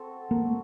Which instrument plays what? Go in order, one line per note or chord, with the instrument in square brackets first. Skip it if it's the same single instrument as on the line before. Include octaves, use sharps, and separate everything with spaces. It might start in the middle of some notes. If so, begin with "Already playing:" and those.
Already playing: [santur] C4 F#4 A4
[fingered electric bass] A#3